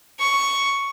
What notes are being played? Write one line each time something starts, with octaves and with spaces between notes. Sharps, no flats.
C#6